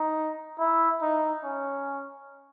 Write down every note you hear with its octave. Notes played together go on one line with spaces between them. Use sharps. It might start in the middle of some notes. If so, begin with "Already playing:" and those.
Already playing: D#4
E4
D#4
C#4